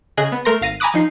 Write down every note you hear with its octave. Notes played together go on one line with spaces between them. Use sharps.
C#3 G#4 D#5 F#6
B3
A3 A#4 C6 A#6
G#1 F5 A#6 D#7
G#5 A#5 B5 D6 D#6 F#6
F3 D#4 C7